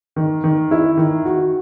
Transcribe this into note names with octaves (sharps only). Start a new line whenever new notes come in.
D#3
D#3
E4
D#3
F#4